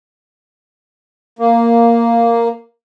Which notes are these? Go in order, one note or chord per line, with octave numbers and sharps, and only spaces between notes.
A#3